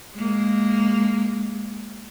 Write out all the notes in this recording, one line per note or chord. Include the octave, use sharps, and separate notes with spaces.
G#3 A#3